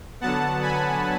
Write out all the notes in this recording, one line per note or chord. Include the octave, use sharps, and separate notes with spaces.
D3 F#3 B3 F#5 A5
G#5 B5